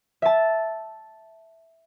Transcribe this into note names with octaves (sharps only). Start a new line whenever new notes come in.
E5 A5